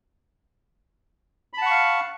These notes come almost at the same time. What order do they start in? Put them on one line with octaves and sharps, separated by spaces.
B5 A5 F#5 C#6 F5